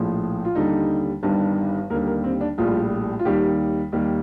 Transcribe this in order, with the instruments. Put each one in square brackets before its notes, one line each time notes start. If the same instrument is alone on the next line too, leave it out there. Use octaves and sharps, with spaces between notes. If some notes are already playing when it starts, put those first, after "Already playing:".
Already playing: [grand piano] A#1 A2 F3
F4
D#2 D3 G3 D#4
G1 G2 D#3 G3
D#2 D3 G3 A#4
A#4
C4
D4
A#1 A2 G3 F4
F4
D#2 D#3 G3 G4
D#2 D#3 G3